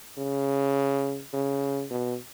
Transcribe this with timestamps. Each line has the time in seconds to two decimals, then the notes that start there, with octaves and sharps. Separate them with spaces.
0.18 C#3
1.33 C#3
1.90 B2